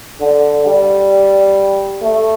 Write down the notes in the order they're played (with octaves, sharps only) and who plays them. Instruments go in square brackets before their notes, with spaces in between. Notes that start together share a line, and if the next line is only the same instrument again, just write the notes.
[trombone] D3
G3
A3